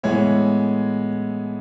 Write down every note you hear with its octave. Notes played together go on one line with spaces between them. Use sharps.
A2 E3 G#3 B3 C#5 E5